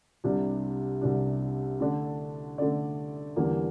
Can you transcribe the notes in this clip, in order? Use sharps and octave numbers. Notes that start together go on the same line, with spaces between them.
C2 C3 G3 D4
C2 C3 G3 D4
D3 A3 D4 A4 D5
D3 A3 D4 A4 D5
E2 D3 G3 A#3